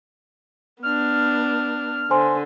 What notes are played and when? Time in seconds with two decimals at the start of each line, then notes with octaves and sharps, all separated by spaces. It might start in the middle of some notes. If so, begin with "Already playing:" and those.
0.83 B3 D4 F6
2.11 D3 C5 G#5 C6